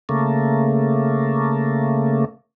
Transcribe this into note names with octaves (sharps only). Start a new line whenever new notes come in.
C#3 A3 A#3